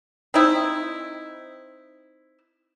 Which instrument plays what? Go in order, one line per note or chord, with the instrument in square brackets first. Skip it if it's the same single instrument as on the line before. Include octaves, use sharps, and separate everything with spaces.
[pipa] C4 D#4 E4